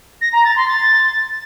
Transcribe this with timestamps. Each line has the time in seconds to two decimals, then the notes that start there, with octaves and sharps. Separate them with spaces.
0.21 A#6
0.33 A#5
0.45 A6
0.56 C6
0.68 A6